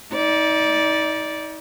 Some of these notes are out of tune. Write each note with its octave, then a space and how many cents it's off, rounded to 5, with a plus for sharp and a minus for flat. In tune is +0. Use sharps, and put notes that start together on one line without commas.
D#4 +35 D5 -10